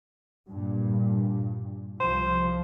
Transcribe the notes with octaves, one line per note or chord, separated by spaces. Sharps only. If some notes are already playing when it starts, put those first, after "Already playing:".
G2 A#2
C2 F3 C5